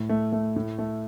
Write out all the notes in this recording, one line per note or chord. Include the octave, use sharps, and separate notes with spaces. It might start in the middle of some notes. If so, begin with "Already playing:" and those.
Already playing: A2
A3
A3
A2
A3